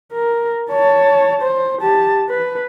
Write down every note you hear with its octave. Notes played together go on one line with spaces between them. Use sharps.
A#4
C#5 A5
C5
G4 A5
B4